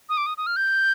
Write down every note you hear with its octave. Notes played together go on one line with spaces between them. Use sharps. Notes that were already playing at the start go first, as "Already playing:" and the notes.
D#6
D6
D#6
D#6
F6
G6